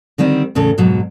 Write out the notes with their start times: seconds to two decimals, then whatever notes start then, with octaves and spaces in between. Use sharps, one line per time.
0.18 D3 D#3 G3 C4
0.55 E2 A2 C#3 A4
0.78 F2 G#2 B2 F#3